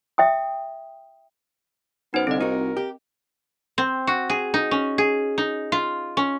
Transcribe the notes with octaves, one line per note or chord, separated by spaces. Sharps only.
E5 G5 D#6
F#2 B3 D#4 C5
C2 D3 C4 D#5
D#4 F#4 A#4
G4
C4
F#4
G#4
D#4
C#4
G#4
D#4
F4
C#4